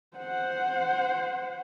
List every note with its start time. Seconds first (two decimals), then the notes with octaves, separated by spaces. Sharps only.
0.17 C5 F#5